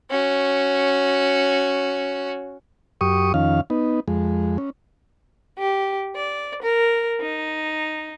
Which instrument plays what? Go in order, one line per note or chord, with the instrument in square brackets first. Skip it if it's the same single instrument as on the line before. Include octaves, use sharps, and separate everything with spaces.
[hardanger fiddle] C#4 F#4
[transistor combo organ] F#2 G4 C#6 D#6
F2 D#3 C#4 F5
B3 D#4
F2 G#3
C#4
[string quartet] G4
D5
A#4
D#4